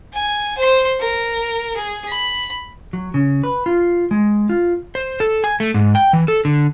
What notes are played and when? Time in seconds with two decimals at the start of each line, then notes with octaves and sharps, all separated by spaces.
0.13 G#5
0.57 C5 C6
1.00 A#4
1.76 G#4
2.08 B5
2.93 F#3
3.14 C#3
3.43 B4
3.66 F4
4.11 G#3
4.49 F4
4.95 C5
5.20 A4
5.44 G#5
5.60 A3
5.74 G#2
5.95 G5
6.13 E3
6.28 A4
6.45 D3